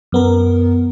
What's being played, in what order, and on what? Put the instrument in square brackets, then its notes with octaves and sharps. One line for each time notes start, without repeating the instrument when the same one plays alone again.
[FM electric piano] F#2 B3 A#4